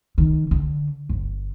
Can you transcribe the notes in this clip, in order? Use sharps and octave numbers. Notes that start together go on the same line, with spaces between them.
D#3
D3
G1